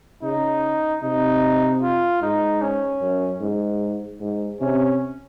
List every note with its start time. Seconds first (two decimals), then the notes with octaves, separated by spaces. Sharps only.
0.23 C#3 D#4
1.03 C3 D#4
1.82 F4
2.22 G#2 D#4
2.61 C#4
3.01 F#2
3.41 G#2
4.21 G#2
4.61 C3 C#4